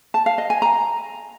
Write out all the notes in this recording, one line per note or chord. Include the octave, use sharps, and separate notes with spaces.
A5
F5
D#5
G#5
A#5